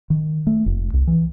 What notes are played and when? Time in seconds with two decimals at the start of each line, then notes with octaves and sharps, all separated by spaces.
0.10 D#3
0.47 A3
0.66 F1
0.94 C2
1.07 E3